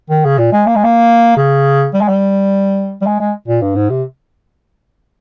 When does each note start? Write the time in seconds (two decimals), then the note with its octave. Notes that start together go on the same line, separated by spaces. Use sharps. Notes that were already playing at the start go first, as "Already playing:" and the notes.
0.10 D#3
0.25 C#3
0.38 A#2
0.52 G#3
0.66 A#3
0.75 G#3
0.84 A#3
1.36 C#3
1.93 G3
2.01 G#3
2.08 G3
3.01 G3
3.06 G#3
3.20 G#3
3.48 A#2
3.62 G2
3.76 G#2
3.90 C3